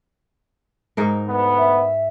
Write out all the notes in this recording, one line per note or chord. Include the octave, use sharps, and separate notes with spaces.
G#2 D#4 A#4
D2 B3
E5